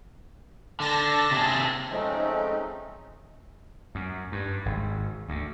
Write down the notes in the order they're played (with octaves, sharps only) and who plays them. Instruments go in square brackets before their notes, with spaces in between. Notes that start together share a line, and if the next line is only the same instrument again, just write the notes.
[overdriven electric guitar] D3 [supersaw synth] A5 A#6
[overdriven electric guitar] C3 G#4
[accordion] F3 G#3 A3 C4 C#4 D#4
[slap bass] F#2
G2
G#1
D2